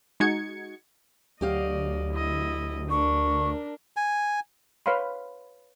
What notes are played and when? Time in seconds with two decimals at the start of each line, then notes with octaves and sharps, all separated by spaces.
0.20 G#3 D#4 F#4 G#6 C#7
1.41 D2 F#3 G4 D5 D#5 F5
2.13 E4 D#5
2.90 D4 A#4 C#6
3.97 G#5
4.86 B4 C#5 F5 B5 C6